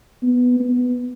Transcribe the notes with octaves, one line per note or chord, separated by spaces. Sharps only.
B3
B3